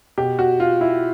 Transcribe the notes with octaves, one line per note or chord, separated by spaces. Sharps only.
B2 G4
F#4
F4
E4